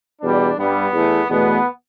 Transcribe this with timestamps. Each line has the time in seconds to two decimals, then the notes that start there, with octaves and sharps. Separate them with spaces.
0.21 E2 B2 G3 D4
0.57 G2 G3 B3
0.92 E2 E3 A3
1.28 E2 B2 A3 B3